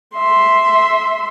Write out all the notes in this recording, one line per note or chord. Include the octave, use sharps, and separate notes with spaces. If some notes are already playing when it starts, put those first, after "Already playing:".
E5 C6